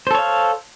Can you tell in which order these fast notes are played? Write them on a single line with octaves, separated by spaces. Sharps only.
C5 A4 C#5 F5